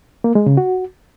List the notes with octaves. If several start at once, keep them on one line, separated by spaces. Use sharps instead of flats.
A#3
G#3
C#3
F#4